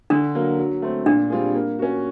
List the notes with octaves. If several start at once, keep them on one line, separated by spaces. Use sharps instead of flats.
D3 D4
F#3 A#3
F#3
A3 C4
A#2 D4
G3 C4 F4 G#4
A#3
C#4 F#4